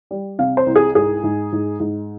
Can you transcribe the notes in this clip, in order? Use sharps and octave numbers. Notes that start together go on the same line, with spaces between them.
G3
C3 F5
C5
C2
G#4
G#2 G#4
G#2
G#2
G#2